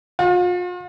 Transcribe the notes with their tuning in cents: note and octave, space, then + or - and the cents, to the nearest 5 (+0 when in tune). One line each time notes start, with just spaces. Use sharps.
F4 +40